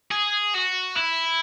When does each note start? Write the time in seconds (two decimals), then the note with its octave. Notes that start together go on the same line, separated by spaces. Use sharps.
0.12 G#4
0.55 F#4
0.97 E4